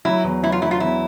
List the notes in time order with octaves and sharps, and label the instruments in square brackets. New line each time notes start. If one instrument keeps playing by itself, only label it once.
[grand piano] F#3 [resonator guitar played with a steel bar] E4
[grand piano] E2
[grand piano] F#3 [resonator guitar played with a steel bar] E4
[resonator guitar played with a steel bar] F4
[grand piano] F#3 [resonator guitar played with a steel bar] E4
[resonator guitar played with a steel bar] F4
[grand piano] E2 [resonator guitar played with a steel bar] E4